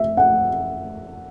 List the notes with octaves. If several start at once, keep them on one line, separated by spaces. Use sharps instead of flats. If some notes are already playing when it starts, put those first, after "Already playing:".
Already playing: E5
F#5